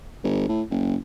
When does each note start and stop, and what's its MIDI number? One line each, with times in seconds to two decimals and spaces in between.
0.23 0.45 31
0.49 0.62 45
0.70 0.96 30